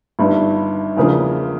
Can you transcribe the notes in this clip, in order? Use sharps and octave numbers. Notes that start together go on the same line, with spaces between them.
G1 G2 D#3
E2 C#3 F3 A#3 D4